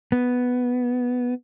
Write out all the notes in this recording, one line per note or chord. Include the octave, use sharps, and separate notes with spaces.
B3